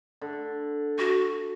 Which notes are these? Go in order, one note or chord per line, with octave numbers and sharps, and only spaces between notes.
D3
F#4 C#6